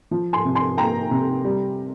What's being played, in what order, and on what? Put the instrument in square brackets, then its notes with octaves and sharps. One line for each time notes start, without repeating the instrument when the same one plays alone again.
[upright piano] F3
G#5 C6
C3
G#5 C6
A#3 G5 A#5
C3
G3